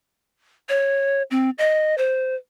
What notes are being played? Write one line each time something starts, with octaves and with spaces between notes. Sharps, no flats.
C#5
C4
D#5
C5